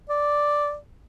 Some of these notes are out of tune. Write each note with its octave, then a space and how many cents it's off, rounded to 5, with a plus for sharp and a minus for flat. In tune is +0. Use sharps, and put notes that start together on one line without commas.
D5 +0